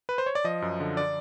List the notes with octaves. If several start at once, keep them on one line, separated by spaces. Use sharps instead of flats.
B4
C5
C#5
D5
F3 D#5
F#2
D3
D5